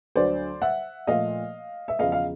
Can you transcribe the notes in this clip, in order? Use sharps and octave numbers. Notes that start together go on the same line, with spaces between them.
D2 D3 F#3 C5 D5
E5 F#5
A#2 F3 A3 D#5 F5
E5
E2 C#3 F3 D#5 F5
F5